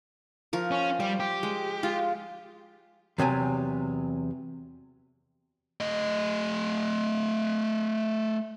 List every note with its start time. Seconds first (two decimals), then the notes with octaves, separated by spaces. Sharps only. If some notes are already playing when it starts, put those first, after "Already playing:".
0.53 F3 A#4
0.71 C#4
1.00 G3 C5
1.20 G4
1.43 G#3
1.83 G#3 F4
3.18 E2 C3 F#3 G#5
5.81 A3 D#5